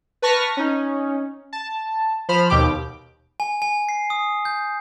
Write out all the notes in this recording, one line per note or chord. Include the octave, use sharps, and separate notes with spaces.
B4 A5 C#6 F6 A#6 B6
C#4 D#4
A5
F3 C5 B5 F6
D#2 B2 G4 D6
G#5
G#5
C7
D#6
G6